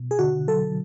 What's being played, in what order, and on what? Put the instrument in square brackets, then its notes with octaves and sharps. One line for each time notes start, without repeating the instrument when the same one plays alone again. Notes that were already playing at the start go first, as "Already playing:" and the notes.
Already playing: [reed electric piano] B2
[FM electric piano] G#4
[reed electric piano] D3 [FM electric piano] F#4
[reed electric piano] F#3 [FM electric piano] A4